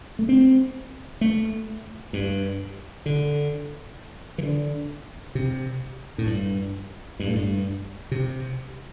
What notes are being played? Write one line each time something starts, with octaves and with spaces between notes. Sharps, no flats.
A3
C4
A3
G2
D3
E3
D3
C3
A2
G2
G2
A2
G2
C3